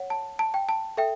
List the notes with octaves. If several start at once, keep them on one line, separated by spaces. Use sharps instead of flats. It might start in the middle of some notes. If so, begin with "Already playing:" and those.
Already playing: C#5 F#5
A5
A5
G5
A5
A4 E5 G5